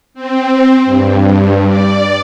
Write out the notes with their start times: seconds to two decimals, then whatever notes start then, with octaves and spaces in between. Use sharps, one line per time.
0.14 C4
0.85 G2
1.66 D5